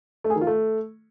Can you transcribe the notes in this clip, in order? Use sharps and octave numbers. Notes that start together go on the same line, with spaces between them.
A3
G#4
D#3
F4
A3